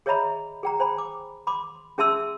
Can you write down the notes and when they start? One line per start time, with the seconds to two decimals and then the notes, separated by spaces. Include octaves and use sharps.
0.06 G#4 C#5 D#5 E5 A#5 B5
0.63 G#4 G5 A#5
0.80 C5 G#5 B5
0.98 D6
1.47 B5 C6 D6
1.98 C#4 G#4 E5 A5 C6 E6